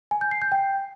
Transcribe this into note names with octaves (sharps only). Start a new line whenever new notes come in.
G#5
G6
C7
G6
G5